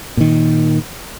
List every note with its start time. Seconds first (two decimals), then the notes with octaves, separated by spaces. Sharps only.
0.17 A#2 D#3